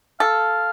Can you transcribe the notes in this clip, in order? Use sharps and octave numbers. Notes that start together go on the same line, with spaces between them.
A4 F5